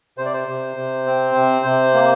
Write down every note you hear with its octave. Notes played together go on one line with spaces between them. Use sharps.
C3 C5
D5
C5
C3
C3
C4
C3
C3
A#3